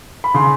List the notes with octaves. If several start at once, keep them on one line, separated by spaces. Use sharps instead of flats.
B5
C#3 C6